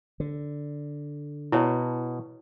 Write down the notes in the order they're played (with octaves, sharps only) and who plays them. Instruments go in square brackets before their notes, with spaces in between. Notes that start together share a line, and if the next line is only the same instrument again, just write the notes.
[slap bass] D3
[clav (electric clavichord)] B2 [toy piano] E4 C#5